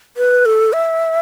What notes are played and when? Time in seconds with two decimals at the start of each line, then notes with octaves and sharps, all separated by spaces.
0.17 B4
0.45 A4
0.73 E5